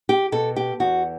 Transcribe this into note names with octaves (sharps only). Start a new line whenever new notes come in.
G4
B2 A4
G4
E2 F#4